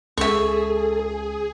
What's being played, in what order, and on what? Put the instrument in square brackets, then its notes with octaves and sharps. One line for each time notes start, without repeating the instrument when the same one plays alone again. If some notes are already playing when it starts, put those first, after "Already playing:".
[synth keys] C#2 [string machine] G#4 [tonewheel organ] A4 [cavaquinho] E5 C#6